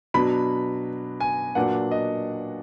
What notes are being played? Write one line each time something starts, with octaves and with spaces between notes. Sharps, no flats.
B2 F#3 D4 B5
G#5
A#2 F#3 B3 D4 F#5
D#5